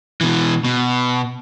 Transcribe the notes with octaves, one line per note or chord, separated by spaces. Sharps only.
B2 E3
B2